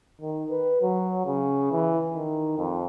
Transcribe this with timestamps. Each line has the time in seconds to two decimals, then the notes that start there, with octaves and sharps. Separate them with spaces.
0.21 D#3
0.50 B4
0.82 F#3
1.26 C#3
1.71 E3
2.14 D#3
2.58 F2